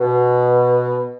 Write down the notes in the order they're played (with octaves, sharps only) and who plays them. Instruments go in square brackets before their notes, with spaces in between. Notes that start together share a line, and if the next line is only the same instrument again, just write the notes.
[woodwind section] B2